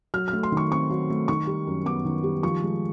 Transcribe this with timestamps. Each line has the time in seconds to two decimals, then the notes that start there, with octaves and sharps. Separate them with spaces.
0.14 F#3 F6
0.28 F6
0.33 A3
0.43 C6
0.52 D#3
0.57 C#6
0.71 C4 C#6
0.90 F#3
1.10 A3
1.28 D#3 C#6
1.47 G3
1.67 F#2
1.85 B3 D6
2.05 D#3
2.24 G3
2.43 F3 C#6
2.62 G#3